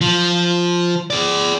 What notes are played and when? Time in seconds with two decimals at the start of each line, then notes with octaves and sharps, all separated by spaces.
0.01 F3
1.10 G#4 D5